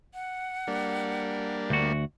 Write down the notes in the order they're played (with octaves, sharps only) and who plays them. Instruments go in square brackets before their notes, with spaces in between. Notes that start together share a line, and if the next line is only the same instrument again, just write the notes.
[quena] F#5
[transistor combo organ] G3 A#3 D4
[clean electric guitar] D2 F#4